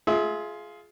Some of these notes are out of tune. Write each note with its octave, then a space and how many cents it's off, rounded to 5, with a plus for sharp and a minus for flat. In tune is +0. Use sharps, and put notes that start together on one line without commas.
F4 +0 G#4 +20 E5 -20